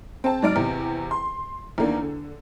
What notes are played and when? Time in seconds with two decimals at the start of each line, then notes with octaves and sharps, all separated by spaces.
0.24 C4 A5
0.42 G#2 F#3 D5 F6 D7
0.56 E2 C3
1.11 C6
1.78 E2 D#3 A#3 D4
2.02 D3